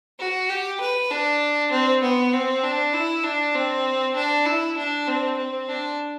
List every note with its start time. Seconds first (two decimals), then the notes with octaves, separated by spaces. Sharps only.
0.19 F#4
0.49 G4
0.80 B4
1.11 D4
1.71 C4
2.03 B3
2.33 C4
2.63 D4
2.94 E4
3.24 D4
3.55 C4
4.16 D4
4.46 E4
4.77 D4
5.08 C4
5.38 C4
5.69 D4